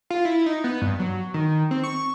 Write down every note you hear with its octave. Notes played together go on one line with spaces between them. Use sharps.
F4
E4
D#4
B3
G2
F#3
D#3
C4
C#6